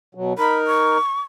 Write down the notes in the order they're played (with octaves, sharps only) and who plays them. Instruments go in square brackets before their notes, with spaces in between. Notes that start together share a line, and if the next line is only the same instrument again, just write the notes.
[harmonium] B2 F#3
[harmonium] D#4 A#4 [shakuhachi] B5
[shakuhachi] C#6